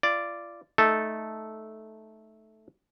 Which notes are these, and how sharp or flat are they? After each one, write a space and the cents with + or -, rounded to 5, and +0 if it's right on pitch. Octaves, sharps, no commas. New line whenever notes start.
F4 -30 D5 +0
A3 -10 D#4 +0 A4 -5